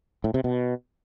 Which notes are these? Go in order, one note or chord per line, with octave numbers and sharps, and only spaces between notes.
A2
C3
B2